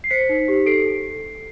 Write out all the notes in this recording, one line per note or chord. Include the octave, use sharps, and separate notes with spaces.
C7
C5 B6 C#7
D#4
G4
A4 C7 D7